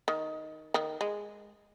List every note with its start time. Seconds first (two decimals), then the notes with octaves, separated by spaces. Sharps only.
0.08 D#3
0.74 D#3
1.01 G#3